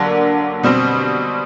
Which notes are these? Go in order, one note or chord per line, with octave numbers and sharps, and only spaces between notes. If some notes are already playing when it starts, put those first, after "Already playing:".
Already playing: D3 F#3 A#3 D4
B2 G3 C4